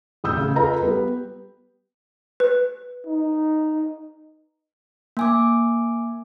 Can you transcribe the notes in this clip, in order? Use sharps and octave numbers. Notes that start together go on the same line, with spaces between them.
A1 D#6 E6 G6
C#3
F4 G#4 A4 B4 D#5 A#5
G3 B3 B4
B4
D#4
A#3 G#5 D6